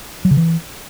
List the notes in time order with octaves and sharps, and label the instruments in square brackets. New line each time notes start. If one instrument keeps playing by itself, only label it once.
[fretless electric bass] F#3
C#3
E3